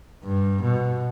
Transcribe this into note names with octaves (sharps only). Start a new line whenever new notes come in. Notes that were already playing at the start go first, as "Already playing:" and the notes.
G2
B2